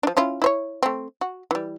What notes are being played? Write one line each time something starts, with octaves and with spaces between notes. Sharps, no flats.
F3 D4
C#4 E4 F4
E4 C5 C#5
A3 C4
F#4
E3 G3